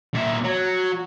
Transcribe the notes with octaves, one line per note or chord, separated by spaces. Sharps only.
A#2 E5
F#3